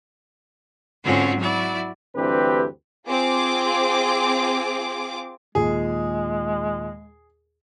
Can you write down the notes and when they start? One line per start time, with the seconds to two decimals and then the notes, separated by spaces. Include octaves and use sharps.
1.04 G#2 D3 C4 C#4 F4 F#4
1.37 F#3 E4 F#4 D5
2.16 D2 G2 E3 C4 G4 B4
3.07 C4 F4 G#4 D6
5.55 D#2 A#2 G#3 G#4